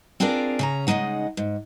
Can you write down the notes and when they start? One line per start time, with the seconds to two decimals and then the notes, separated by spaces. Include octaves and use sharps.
0.20 C4 D4 F4 G#4 A#4 D5
0.59 C#3 C#4 A#5
0.87 C#3 F#3 G#3 D#4 F#5
1.37 G#2